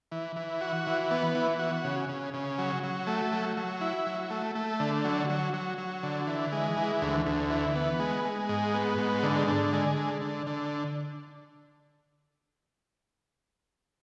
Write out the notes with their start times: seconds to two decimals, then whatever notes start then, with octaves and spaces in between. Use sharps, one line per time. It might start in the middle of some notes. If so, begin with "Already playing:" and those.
0.12 E3
0.36 E3
0.61 F#4
0.87 E3
1.11 B3
1.35 E3
1.59 F#4
1.84 C#3
2.09 C#3
2.34 C#3
2.58 F#3
2.83 F#3
3.07 A3
3.32 F#3
3.57 F#3
3.81 E4
4.07 F#3
4.30 A3
4.55 A3
4.80 D3
5.04 F#3
5.29 F#3
5.54 F#3
5.78 F#3
6.03 D3
6.27 E3
6.52 G#3
6.77 E3
7.02 D2
7.26 D2
7.50 E3
7.75 B3
8.00 G#3
8.25 G#3
8.49 G#2
8.74 B3
8.98 G#2
9.23 D3
9.48 D3
9.73 G#3
9.97 D3
10.22 D3
10.47 D3